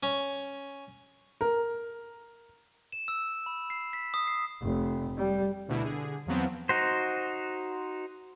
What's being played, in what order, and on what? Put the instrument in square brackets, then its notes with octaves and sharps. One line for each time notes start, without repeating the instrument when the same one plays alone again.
[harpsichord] C#4
[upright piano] A#4
[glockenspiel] E7
E6
B5
C7
B6
D#6
C7
[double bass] F1
G3
[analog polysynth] D2 B2 E4
D3 G#4
E2 F3 F#3 B3 C4
[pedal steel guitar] D#4 F#4 C5